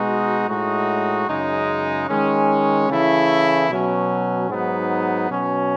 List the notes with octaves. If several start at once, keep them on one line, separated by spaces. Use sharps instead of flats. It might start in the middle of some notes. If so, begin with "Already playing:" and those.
Already playing: B2 G#3 D#4 F#4
A2 G#3 D#4 F#4
F#2 C#3 G#3 D#4
D#3 G#3 C#4
C#3 E3 A3 E4
B2 F#3 C#4
G#2 F#3 B3 D#4
B2 F#3 C#4